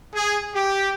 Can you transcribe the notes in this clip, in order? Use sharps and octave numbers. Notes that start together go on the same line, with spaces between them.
G#4
G4